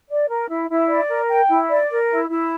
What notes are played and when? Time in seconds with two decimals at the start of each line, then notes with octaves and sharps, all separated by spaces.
0.09 D5
0.29 A#4
0.49 E4
0.69 E4
0.90 D5
1.09 A#4
1.29 G5
1.49 E4
1.69 D5
1.90 A#4
2.10 E4
2.30 E4